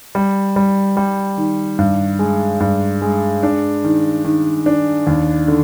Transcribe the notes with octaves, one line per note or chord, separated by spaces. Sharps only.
G3
G3
G3
D#3
G2
G#3
G2
G#3
D4
D#3
D#3
D4
D#2
D3